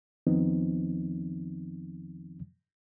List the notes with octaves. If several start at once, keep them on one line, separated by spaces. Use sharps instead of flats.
F2 D#3 F3 B3 C4 D#4